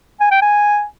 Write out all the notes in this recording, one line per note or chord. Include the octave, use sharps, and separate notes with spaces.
G#5
G5
G#5